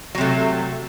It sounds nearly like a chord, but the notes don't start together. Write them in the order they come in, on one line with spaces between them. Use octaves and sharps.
F#3 C3 A3